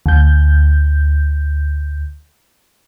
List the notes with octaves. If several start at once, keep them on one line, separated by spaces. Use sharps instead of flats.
D2 G6